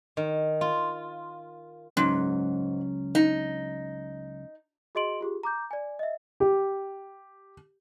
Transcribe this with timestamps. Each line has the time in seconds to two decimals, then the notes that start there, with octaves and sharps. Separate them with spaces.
0.17 D#3
0.61 F4
1.97 C#2 G#2 F#3 C#4
3.15 D#4
4.95 F#4 G#4 D#5 C6 D7 F#7
5.21 F4 G4 G#4
5.43 A#5 D6 G6
5.71 D5 G#5
5.99 D#5 E5
6.40 G4